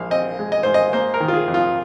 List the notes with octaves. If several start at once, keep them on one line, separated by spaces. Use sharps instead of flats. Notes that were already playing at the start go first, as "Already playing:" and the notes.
Already playing: A#1 G#2 F5
C4 D#5
G#3
D#5
G#2 C5
D#5
A#3 C5
A#4
D#3
F4
G#4
F2
F4